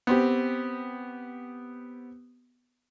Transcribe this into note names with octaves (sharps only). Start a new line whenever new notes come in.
B3 C4 G4